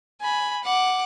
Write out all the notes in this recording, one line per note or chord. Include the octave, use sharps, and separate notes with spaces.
G#5 B5
F#5 D6